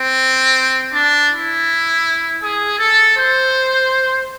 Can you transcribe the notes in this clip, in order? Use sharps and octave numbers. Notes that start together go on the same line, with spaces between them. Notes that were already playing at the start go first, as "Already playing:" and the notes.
Already playing: C4
D4
E4
G#4
A4
C5